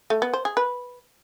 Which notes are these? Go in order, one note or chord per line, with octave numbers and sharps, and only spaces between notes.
A3
B3
C5
G#4
B4